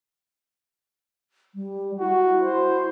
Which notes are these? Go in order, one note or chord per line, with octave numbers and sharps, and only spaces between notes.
G3
E4 F#4
C5